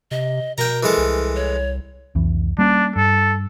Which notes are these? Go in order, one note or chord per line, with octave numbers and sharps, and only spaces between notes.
C3 D#5
B2 A#4 G5 A#5
E3 G#3 A4
C2
C#5
C2 F2 E3
G3 A#3 C#4 D4
G2 A4